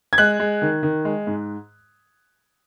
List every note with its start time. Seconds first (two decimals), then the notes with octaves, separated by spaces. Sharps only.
0.13 G#6
0.18 G#3 F#6
0.40 G#3
0.62 D#3
0.83 D#3
1.05 G#3
1.27 G#2